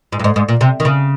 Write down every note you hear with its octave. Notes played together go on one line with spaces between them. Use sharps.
G#2
G2
G#2
G#2
A#2
C3
D#3
C#3